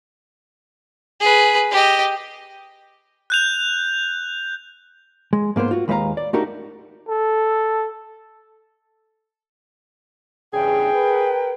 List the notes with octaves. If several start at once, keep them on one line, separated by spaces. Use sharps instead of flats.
G#4 B4
G4 D#5
F#6 G6 F7
G#3
G#2 A#3 B3 C5
F4 F#4
D#2 G#3 B4 E5 F5 A#5
D5
A3 D4 D#4 F#4 G4 A#4
A4
E2 G2 C#3 G#4 G5
A#4 B4